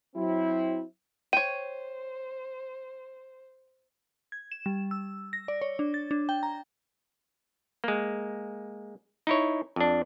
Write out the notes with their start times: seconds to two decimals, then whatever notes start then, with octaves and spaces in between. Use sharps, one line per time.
0.15 F#3 C4 E4
1.33 C5 C#5 G5 D#7
4.32 G#6
4.52 E7
4.66 G3
4.91 E6
5.33 A#6
5.48 D5
5.62 C#5
5.79 D4
5.94 A6
6.11 D4
6.29 G5
6.43 A#5
7.84 G#3 A#3
9.27 D#4 E4 C#5
9.76 F2 D4